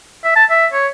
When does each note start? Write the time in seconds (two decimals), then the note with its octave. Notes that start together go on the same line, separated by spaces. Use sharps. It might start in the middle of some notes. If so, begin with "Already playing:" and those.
0.24 E5
0.36 A5
0.50 E5
0.73 C#5